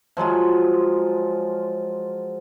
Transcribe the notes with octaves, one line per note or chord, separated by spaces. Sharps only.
F3 F#3 G#3 F4